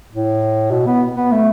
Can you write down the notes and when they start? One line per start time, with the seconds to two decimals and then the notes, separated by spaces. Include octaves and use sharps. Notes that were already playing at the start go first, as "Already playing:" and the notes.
0.12 A2
0.71 B2
0.87 B3
1.16 B3
1.32 A3